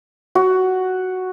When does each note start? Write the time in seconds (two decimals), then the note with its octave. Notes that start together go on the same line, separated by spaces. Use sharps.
0.35 F#4